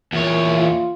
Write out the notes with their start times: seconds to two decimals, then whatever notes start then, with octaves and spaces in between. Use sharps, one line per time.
0.12 E2 A#2 C#5
0.51 F4